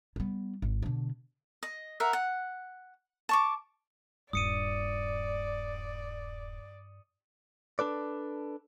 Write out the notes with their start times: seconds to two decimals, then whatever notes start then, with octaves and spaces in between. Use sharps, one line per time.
0.16 G3 B3
0.62 G#1
0.82 B2 D3
1.63 D#5
2.00 A#4 E5 F#5
2.13 F#5
3.29 A5 C#6 D6
4.33 D#1 G2 D5 D#6 C#7 D#7
7.79 D4 A4 B4 D5